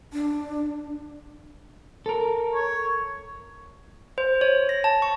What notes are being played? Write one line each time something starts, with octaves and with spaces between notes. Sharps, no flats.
D4
A4 A#4
C#5
C5
C#5
A#6
A5
C#6